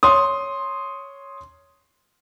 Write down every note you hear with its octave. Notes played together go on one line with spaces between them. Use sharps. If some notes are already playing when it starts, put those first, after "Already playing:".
C#5 C6 D#6